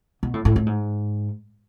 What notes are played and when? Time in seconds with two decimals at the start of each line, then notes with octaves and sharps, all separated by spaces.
0.23 B2
0.34 A2
0.45 A2
0.56 A2
0.66 G#2